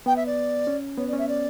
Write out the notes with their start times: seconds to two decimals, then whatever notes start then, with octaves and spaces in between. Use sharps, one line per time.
0.06 B3 G5
0.16 E5
0.26 D5
0.67 C#4
0.97 B3 C#5
1.08 D5
1.13 C#4
1.18 E5
1.28 D5